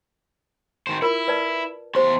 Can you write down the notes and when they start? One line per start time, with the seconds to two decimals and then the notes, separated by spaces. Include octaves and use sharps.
0.87 D#3 C5
1.02 E4 F4 A#4
1.28 B4 D5 A5
1.95 E2 G4 C5 C6